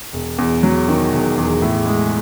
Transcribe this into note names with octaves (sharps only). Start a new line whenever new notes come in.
E1
E2
F#3
D#3
E1
E2
A2
G#3